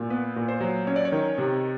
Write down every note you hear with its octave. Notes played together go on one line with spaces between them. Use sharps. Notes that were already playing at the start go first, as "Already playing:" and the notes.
Already playing: A#2
B3 B4
A#2
C5
F#3
C#4 C#5
D5
C#5
D#3
C3